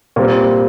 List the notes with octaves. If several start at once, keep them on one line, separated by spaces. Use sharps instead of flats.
A#2 G3 C4